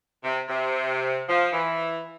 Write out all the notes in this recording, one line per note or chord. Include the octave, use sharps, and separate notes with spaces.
C3
C3
F3
E3